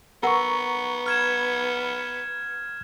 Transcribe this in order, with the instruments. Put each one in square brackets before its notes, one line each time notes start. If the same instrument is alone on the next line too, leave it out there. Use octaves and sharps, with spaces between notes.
[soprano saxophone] B3 [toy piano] A#4 F#5 [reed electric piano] A#5 C#6
[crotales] F6 G#6 E7